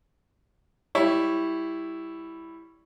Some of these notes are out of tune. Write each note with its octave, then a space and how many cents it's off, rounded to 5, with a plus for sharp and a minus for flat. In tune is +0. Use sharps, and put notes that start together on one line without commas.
G3 +0 E4 +0 C#5 +0